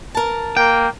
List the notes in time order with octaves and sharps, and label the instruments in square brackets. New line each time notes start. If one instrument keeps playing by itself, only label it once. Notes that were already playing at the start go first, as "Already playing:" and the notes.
[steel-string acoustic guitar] A#4 A5
[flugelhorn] A#3 [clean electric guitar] G5